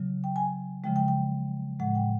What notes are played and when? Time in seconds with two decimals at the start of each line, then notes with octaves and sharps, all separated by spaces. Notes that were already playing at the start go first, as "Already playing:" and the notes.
Already playing: C#3 F#3
0.24 G5
0.36 G#5
0.84 C#3 F3 G#3 G5
0.96 G5
1.08 G5
1.80 A2 F3 G#3 F#5
1.95 G5